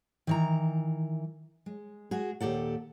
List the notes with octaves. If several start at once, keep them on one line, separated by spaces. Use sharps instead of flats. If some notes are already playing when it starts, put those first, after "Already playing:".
D#3 E3 A#5
G#3
G#3 F#4 G#4
D#2 A#2 G4 A4 F#5